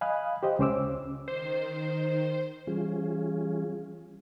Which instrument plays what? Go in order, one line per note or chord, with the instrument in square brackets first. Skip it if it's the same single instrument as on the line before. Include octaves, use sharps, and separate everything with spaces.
[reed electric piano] D#5 F5 G#5 B5 D#6 F#6
G4 C5 D#5
C#2 C#4 C5 D6 E6
[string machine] D#3 [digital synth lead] C5
[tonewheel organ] E3 G3 C#4 F4 G#4